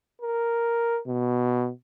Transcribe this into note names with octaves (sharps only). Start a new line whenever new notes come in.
A#4
B2